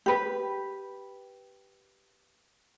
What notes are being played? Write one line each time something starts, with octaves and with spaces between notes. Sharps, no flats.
G4 B4